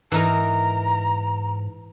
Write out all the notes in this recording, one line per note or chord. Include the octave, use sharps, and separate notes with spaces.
G#2 E3 D#4 A#4 A#5